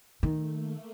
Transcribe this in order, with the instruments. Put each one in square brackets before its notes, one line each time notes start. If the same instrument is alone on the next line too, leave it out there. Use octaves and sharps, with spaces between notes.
[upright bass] D#3 [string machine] A3
[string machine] A#3